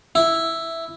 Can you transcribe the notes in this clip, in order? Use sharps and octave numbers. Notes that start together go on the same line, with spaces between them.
E4